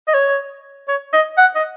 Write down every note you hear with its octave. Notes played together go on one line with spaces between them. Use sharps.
D#5
C#5
C#5
D#5
F#5
D#5